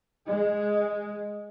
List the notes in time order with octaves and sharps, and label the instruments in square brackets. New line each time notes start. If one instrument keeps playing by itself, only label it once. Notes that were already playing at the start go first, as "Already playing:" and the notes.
[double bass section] G#3